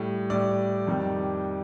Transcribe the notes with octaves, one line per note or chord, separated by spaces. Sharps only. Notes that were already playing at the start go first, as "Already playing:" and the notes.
Already playing: A2 G3
A2 G3 D5
F2 D#3 G3